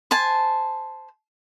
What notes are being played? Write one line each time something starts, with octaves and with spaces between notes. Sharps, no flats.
C5 G#5 A5